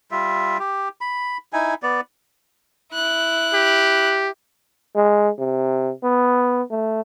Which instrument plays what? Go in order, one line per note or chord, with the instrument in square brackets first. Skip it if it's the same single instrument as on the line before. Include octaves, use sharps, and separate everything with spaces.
[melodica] G3 F4 E5
G4
B5
D#4 E4 G#5
B3 D5
[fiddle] E4 F#6
[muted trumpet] G4
[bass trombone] G#3
C3
B3
A3